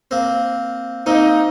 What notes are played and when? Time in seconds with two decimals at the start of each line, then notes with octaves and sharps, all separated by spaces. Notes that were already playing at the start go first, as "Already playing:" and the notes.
0.11 A#3 C4
1.06 A#3 C4 D#4